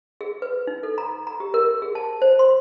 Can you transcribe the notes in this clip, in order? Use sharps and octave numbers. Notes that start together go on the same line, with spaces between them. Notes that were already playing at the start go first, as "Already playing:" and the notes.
G#4
B4
D#4
A4
A#5
A#5
G4
A#4
G#4
A5
C5
C6